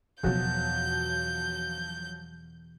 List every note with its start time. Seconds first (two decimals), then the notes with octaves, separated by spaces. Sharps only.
0.23 E2 B2 F3 F#3 G6